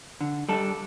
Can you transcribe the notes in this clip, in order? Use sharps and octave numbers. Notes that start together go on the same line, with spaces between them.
D3
G3 D4 A4